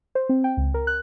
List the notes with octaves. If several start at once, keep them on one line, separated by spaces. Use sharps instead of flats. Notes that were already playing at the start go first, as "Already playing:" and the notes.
C5
C4
G5
C#2
A#4
F#6